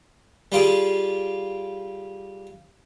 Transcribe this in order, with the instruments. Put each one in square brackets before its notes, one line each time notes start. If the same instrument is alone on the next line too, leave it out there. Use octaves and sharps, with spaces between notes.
[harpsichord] G3 F4 G4 G#4